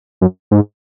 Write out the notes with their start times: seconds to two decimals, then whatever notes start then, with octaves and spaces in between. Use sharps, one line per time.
0.21 F#2
0.51 G#2